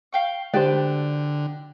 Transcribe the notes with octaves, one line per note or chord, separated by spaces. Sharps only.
F5 G5 C#6
D3 G#3 G4 B4 C5 D5 G5 A5